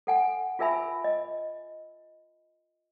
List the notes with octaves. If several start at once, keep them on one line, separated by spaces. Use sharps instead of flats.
A4 F#5 G#5
F4 G#4 A#4 E5 G#5 B5
D#5